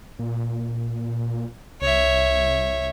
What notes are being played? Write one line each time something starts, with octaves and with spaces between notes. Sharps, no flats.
A#2
C2 C#5 E5